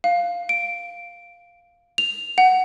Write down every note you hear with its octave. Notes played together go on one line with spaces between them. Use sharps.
F5
D7
F7
F#5